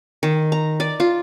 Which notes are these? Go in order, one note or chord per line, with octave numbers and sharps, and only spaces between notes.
D#3
A#5
D5
F4